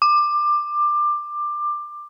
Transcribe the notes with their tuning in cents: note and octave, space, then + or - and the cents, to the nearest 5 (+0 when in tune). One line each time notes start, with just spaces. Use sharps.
D6 +20